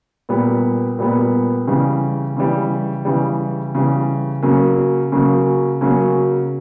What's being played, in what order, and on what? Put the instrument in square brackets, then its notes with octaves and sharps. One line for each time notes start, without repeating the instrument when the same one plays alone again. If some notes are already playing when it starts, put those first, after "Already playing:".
[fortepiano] A#2 G3 B3
A#2 G3 B3
C#3 E3 G3
C#3 E3 G3
C#3 E3 G3
C#3 E3 G3
C#3 F#3 A#3 C#4
C#3 F#3 A#3 C#4
C#3 F#3 A#3 C#4